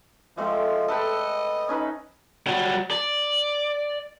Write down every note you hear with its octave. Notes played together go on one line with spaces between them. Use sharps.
F3 G#3 A3 C4
A4 B4 D#5 G5
C#4 D#4 B4
F#3 G3
D5